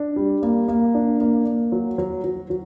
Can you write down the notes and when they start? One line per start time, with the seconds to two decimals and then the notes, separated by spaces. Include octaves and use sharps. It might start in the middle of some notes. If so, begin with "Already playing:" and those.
Already playing: D4
0.16 G3
0.43 A#3
0.68 A#3
0.94 D4
1.21 A#3
1.46 A#3
1.72 F#3
1.98 F#3
2.24 F#3
2.50 F#3